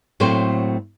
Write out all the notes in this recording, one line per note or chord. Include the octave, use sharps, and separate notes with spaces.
A2 F#3 A3 A#3 C4 C5